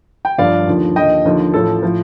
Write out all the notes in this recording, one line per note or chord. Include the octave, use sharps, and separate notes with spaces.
G5
G1 G2 D3 F3 D5 F5
D#2 D3 F3
D#2 D3 F3 D#5 G5
D#2 D3 F3
A1 A2 F3 A4
A2 F3